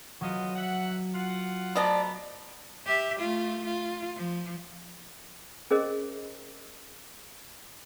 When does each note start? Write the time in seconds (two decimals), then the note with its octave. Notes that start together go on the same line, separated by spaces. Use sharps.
0.21 F#3 B3 F4 D#5
0.55 E5 F#5
1.13 F4 F#5
1.75 F3 A3 B3 D5 D#5 A5 A#5
2.86 G4 E5
3.20 A3 F4
3.65 F4
4.16 F3
5.71 C#4 G#4 A#4 C5 D#5